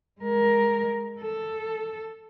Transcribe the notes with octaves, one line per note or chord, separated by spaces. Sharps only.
G#3 A#4
A4